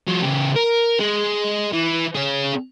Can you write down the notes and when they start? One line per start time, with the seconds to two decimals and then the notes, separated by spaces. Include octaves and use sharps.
0.08 F3 F#4
0.23 C#3 G4
0.56 A#4
1.00 G#3
1.72 E3
2.15 C#4 G#4